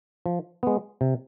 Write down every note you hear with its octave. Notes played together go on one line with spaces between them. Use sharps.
F3
G#3 B3
C3